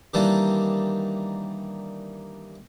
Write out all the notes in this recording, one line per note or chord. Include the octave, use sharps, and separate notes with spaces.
D#3 E3 G3 A#3 D4